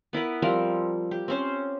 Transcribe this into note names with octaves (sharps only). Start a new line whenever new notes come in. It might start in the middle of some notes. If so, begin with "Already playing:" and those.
B3 E4 A#4 B4
F3 G3 C4 A#4
G4
C4 C#4 C5